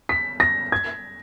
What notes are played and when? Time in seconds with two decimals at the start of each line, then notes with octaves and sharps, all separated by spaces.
0.09 B6
0.40 A#6
0.72 G#6